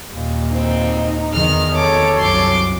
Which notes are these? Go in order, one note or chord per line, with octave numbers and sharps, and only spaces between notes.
D#2 A#2
C4 D#4
E2 D#3 F6
A4 C#5 D6
C2 F#2 C6 D6